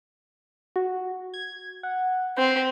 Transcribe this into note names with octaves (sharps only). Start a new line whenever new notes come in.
F#4
G#6
F#5
C4 G5